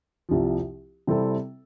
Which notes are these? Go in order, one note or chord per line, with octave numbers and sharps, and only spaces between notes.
C2 C3 F3
C3 G3 C4 E4 A4